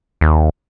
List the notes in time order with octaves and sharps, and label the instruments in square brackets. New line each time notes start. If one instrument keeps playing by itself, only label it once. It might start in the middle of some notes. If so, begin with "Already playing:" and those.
[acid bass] D#2